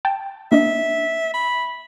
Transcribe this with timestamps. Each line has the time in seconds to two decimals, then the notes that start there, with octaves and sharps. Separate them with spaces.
0.05 G5 A5
0.52 A#3 D4 D#5 E5
1.34 B5